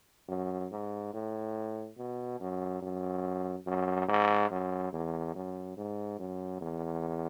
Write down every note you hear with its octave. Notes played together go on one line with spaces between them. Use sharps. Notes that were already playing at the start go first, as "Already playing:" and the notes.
F#2
G#2
A2
B2
F#2
F#2
F#2
G#2
F#2
E2
F#2
G#2
F#2
E2